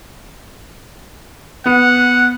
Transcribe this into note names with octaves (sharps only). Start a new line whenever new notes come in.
B3 F#5